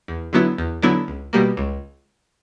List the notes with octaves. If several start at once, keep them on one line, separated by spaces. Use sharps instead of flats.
E2
D3 F#3 B3 E4
E2
D3 F#3 B3 E4
C#2
B2 G3 A#3
C#2